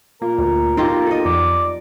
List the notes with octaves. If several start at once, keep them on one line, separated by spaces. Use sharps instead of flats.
A#2 A#3 A#4
D2
B1 A#3 D#4 F4 G4 E6 A#6
A4 D#5
F2 D5